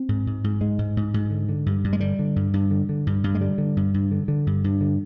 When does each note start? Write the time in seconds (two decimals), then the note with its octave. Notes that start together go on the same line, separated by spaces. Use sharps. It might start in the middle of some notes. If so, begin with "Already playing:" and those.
Already playing: C4
0.09 G#2
0.27 G#2
0.44 G#2
0.61 G#2 G#3
0.79 G#2
0.97 G#2
1.14 G#2
1.30 D3
1.49 D3
1.66 G2
1.84 G2
1.93 G#3
2.00 D3 G3
2.19 D3
2.36 G2
2.53 G2
2.71 D3
2.89 D3
3.07 G2
3.24 G2
3.35 G#3
3.40 D3 G3
3.58 D3
3.77 G2
3.94 G2
4.12 D3
4.28 D3
4.47 G2
4.64 G2
4.81 D3